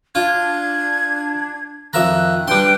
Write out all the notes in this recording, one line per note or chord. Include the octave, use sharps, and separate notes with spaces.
D4 F4 G#6
F2 D#3 E5 A#5 F#6
G3 D4 B4 G5 C6